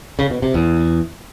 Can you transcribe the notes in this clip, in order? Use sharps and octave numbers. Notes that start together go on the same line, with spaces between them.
C#3
B2
C3
E2